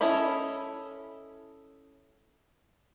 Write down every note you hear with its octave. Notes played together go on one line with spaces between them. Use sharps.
C#4 E4 A4 D#5 B5